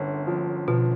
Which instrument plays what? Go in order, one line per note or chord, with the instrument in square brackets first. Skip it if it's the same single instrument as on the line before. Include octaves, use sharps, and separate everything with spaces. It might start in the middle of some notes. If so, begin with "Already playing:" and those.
Already playing: [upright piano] G1 F#2 D3
F3
[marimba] B2 [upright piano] F3